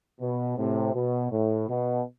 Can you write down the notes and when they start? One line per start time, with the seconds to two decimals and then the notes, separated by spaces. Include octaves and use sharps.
0.20 B2
0.57 A2 C3
0.94 B2
1.31 A2
1.68 B2